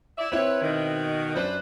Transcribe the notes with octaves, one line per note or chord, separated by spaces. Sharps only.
E4 D5 E5
C4 E4 B4 C#5
B2 D#3
F#2 D4 B4 C5